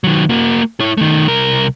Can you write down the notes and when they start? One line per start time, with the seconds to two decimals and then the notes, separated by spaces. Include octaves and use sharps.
0.04 D#3 F#3
0.29 A#3 F#4
0.80 E4 C#5
0.97 D#3 A3
1.27 C2 A#4